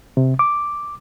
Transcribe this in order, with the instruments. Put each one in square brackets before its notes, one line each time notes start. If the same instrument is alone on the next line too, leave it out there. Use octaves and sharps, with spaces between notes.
[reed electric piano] C3
D6